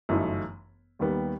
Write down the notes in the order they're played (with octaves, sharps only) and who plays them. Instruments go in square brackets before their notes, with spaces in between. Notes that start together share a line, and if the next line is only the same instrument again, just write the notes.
[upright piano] G1 F#2 E3 A3 D#4
D#2 D#3 G3 B3